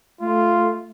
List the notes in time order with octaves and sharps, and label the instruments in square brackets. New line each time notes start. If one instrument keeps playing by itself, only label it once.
[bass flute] A3 [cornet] F4